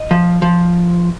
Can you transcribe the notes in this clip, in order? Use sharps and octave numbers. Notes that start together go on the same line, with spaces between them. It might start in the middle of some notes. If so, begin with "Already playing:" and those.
Already playing: D#5
F3
F3